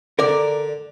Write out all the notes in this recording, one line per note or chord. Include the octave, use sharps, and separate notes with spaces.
D3 A#4 D5